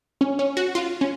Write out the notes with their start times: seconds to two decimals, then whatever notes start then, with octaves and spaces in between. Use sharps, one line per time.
0.21 C#4
0.39 C#4
0.57 F#4
0.75 F4
1.01 C#4